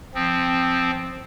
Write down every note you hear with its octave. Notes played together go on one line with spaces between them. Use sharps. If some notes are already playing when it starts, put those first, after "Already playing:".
F3 C4